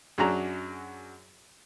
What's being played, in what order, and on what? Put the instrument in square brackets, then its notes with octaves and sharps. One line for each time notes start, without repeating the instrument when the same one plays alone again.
[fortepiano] F#2 F#3 D4 F#4 G#4 A#5